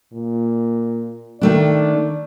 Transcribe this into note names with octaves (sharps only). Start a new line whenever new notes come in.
A#2
D#3 A3 D4 D5